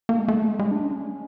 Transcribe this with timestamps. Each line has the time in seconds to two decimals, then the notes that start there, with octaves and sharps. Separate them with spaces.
0.09 A#3
0.19 G#3
0.28 A3
0.47 G#3
0.59 G#3
0.71 D4
0.85 C#4